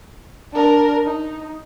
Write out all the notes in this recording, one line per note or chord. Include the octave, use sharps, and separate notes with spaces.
D4 A#4
D#4